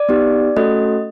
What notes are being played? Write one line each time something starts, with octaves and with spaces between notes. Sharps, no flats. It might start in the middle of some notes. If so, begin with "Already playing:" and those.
Already playing: D5
B3 D#4 G4
A3 C#4 F#4 A4 D#5